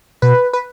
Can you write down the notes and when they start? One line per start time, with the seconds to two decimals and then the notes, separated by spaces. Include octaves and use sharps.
0.22 B2 B4
0.53 B4